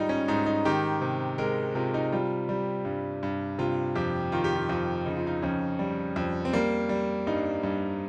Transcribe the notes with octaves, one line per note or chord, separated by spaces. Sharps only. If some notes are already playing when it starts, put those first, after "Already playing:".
Already playing: G#2 D#3 G3 D#4 F4
C#4
G#2 D#4
D#4
D#3 G4
C3
G#3 A#4
C3 F4
D#4
G3 F4
G3
G2
G2
C3 F4
F2 G4
D#3 F4
G4
F4
F2 F4
C#3 D#4
F4
D#4
F2 C#4
G3
F2
C4
G3 A#3
G3
G2 D#4
G2